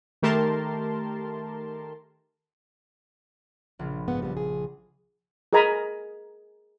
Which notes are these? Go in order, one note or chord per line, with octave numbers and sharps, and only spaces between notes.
D#3 A3 G4 A#4 A5 C6
A#1 C#3
G#2 B3 F#5
G3 B3
G#4
G#4 A#4 D#5 G#5 A#5 B5